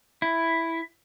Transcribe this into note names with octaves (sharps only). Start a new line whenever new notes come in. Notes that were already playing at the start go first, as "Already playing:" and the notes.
E4